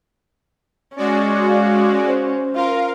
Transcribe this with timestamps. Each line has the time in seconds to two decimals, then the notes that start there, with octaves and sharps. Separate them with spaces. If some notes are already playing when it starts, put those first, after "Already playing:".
0.97 G#3 C#4 F#4 D5
1.48 F5
2.07 C5
2.55 F4 A#4 F5